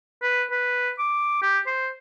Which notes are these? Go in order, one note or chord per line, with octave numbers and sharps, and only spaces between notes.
B4
B4
D6
G4
C5